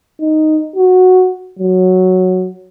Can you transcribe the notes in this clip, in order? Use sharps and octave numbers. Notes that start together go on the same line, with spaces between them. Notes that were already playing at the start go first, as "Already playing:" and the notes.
D#4
F#4
F#3